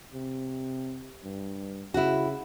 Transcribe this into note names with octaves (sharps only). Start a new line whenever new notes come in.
C3
G2
C#3 E4 F#4